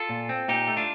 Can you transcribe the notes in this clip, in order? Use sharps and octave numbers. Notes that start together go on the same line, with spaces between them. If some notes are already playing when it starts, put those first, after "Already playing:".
Already playing: F4 A4
A#2
C4
A#2 D#4 G4
A3
D4 F4